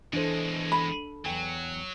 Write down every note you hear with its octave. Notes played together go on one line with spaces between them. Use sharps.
B2 E3 G#3 D4 A4 C5
B5
E2 F#3 G5 G#5